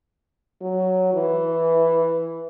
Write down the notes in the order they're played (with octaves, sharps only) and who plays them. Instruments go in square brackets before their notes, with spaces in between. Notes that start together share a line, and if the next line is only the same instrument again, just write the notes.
[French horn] F#3
E3